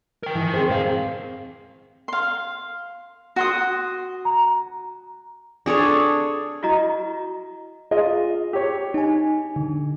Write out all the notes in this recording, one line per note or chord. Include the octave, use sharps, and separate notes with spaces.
A#4 G5
E3 F3
C4 G#4 C5
G#2 F5
F5 C6
F#4 C6 D#6
A#5
D4 G#4 A4 C#5
E4 F#4 D#5 A#5
F4 G#4 D#5
G4 C#5
D#4 G#5
D3